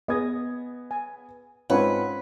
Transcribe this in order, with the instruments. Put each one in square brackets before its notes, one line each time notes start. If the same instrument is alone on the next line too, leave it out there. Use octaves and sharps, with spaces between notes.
[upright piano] B3 G#4 G#6 [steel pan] D#5 D#6
[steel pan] G#5
[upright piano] G#2 C4 C#4 [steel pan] F4 C#5 F#5 [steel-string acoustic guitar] B4